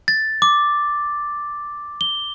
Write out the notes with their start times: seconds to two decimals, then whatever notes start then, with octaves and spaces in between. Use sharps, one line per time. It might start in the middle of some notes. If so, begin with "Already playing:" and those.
0.08 A6
0.42 D6
2.01 G7